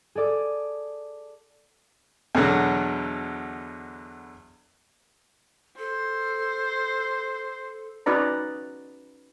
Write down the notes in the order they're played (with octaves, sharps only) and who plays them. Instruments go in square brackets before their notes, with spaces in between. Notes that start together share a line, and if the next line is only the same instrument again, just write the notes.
[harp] G#4 A4 D5 D6
[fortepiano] E2 B2 D3 F#3
[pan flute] A4 [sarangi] C5
[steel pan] C#4 D#4 F#4 B4 D5 A#5